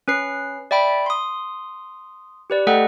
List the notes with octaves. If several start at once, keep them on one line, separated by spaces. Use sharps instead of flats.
C#4 B4 C7
D5 E5 G5 B5 D7
C6 D#6
G4 B4 D5
A3 A4 D#5 F#5 G5